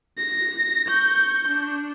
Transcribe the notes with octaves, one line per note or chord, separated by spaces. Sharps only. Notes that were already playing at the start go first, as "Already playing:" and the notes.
A#6
C#6 G6
D4